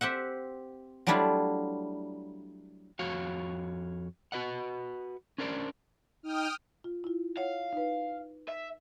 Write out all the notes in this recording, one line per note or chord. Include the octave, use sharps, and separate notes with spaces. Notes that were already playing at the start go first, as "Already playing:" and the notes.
C4 G4 E5 F#5
F#3 G3 A3 D4 E4 F4
F2 F#4 C#5 F5
F#4 B4 D#5 F#5
C#4 D4 A#4 C5 D5
D#4 G5 D#6 F6
F4
E4 F4
C#5 F5 F#5
D#4 B4
E5